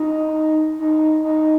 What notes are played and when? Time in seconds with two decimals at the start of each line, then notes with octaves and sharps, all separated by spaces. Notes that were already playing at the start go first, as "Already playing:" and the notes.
Already playing: D#4
0.79 D#4
1.24 D#4